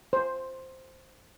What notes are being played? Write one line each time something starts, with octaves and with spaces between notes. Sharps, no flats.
C5